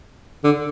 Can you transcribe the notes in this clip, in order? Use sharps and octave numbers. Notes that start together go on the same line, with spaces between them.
D3